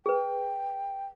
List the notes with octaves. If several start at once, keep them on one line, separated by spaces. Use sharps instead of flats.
G#4 B4 G5